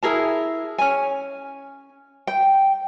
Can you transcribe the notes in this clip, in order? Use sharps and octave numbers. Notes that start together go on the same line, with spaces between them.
E4 G#4 A#4 A5
C#4 G#5
G5